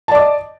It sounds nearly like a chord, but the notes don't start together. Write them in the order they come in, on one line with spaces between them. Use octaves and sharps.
A5 D5 D6 D#5